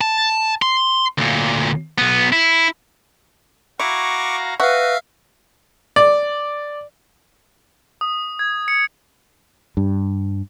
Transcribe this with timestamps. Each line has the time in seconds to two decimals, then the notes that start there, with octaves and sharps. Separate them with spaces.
0.01 A5
0.62 C6
1.18 D2 A#2
1.98 B1 B3
2.32 E4
3.80 E4 F#4 F5 A#5 C#6 D6
4.60 F#4 B4 E5 F5
5.96 D5
8.01 D#6
8.39 G#6
8.68 C#7
9.77 G2